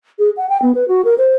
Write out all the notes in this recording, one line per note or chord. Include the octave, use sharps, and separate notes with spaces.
G#4
F#5
G5
B3
B4
F#4
A#4
C5